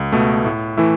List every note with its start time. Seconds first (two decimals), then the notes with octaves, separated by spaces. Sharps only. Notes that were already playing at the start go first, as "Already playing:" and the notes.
Already playing: C#2
0.12 B2 A3
0.45 A2
0.77 E3 A3 E4